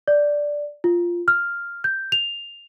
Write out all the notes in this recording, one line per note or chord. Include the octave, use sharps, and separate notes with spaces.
D5
F4
F6
G6
F7